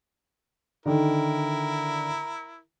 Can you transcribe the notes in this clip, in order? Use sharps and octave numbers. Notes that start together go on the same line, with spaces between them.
D3 D#3 E4 A#4